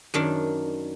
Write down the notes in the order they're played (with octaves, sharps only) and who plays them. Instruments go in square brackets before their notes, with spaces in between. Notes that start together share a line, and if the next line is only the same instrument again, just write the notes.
[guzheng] F#2 D#3 D4